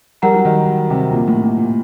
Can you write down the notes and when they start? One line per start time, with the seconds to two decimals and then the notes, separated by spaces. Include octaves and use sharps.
0.22 G3 A#4 F#5 A#5
0.34 F#3
0.45 D#3
0.90 C3
1.12 A#2
1.28 A2
1.43 A#2
1.58 A#2